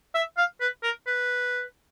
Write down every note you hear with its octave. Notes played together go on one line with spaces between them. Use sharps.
E5
F5
B4
A#4
B4